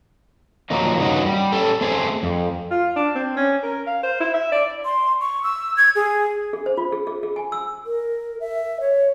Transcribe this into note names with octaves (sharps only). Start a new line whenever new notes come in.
A#2 D#3 F3 F#3 A#3 D#4
G2 C#3 B3 D#4 F#4
G3
C#4 A4
A3 C4 G#4 C5
F2
F4
D4
C4
C#4
A#4
F5
C5
E4
E5
D5
C6
C#6
E6
G#6
G#4
G#4
C5
F4
G#4
G#4
G#4
G#5
E6
A#4
E5
C#5